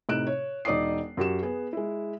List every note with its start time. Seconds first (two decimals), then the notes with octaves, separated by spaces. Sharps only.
0.09 A2 C3 D#4 F#6 D7 E7
0.27 C#5
0.65 E1 D#4 D5 D6 D#6 C7
1.17 F#2 F#4 G4 E7
1.43 B3 G#4
1.73 G#3 E4